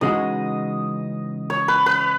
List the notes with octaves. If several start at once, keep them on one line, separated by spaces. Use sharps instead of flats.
C#3 E3 G#3 D#4 F#4 D#5
C#5
B4
B4